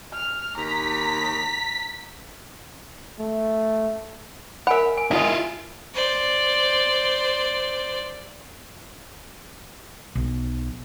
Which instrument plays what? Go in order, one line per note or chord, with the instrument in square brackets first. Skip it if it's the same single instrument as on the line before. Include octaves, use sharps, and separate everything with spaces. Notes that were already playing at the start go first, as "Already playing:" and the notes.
[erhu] F6
[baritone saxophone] D#2 [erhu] A#5 [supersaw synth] B6
[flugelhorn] A3
[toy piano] A#4 G#5 B5 [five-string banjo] E5 F#5
[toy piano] G#5
[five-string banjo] D#3 G#3 [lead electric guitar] E4 F4
[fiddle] C5 D5
[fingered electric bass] B1